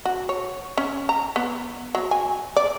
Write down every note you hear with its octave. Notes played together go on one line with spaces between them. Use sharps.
F#4
C#5
C#4
A#5
B3
F#3
G#5
D5